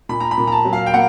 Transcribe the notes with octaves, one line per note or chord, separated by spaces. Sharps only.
A#2 B5
A#5
B5
A#2
A#5
A5
F#3
F5
G5
A#3 F#5